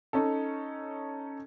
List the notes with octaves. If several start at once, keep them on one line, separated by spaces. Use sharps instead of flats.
C#4 D#4 A4